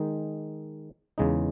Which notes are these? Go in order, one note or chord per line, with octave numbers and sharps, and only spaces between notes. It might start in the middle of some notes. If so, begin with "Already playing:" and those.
Already playing: D#3 G#3 D#4
E2 C#3 G#3 D#4